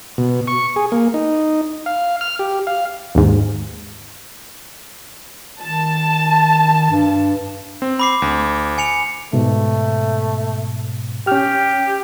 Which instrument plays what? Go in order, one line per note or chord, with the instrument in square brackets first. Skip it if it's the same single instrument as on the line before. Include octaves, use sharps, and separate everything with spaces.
[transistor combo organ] B2
C#6
G#4
A#3
D#4
F5
F6
G4
F5
[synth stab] D#2 G#2
[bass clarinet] D#3 [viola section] A5
[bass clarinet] G2
[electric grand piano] C4
[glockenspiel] B5 D6 C7
[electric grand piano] D2
[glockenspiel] G#5 C#7 F7
[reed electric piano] G#2 B2 [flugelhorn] A3
[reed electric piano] C#4 F6 [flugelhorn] G4